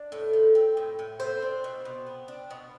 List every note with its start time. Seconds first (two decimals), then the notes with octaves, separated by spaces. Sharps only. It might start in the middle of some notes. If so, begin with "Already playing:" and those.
Already playing: D4 D5
0.12 A2
0.33 F3
0.55 C4
0.77 A2
0.99 A2
1.20 B3 C4 C5
1.42 D4
1.64 B2
1.85 B2
2.07 B3
2.28 D4
2.51 B2